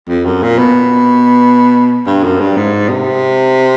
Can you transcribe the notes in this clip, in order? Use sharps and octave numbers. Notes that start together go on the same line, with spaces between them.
F2
F#2
A#2
B2
G2
F#2
G2
G#2
C3